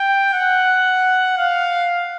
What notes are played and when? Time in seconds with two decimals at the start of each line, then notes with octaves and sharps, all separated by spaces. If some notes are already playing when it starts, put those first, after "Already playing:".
Already playing: G5
0.34 F#5
1.38 F5